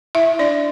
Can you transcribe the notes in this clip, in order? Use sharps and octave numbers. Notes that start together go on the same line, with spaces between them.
E4 E5
D4 D5